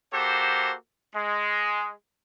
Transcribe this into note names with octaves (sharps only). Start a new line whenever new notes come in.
A#3 F#4 G4 A4 C5
G#3